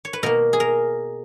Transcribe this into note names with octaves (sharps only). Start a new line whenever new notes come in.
C#5
B4
B2 A#3 A#4
G#4
A#4